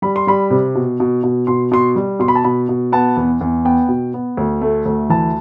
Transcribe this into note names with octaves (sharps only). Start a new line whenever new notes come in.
G3 B5
C6
G3 B5
C3
B2
B2
B2
B2 C6
B2 C6
G3
B2 C6
B5
A5
B2 B5
B2
B3 A5
E2
E2
B3 G5
B2
B3
D2
A3
D2
E3 A5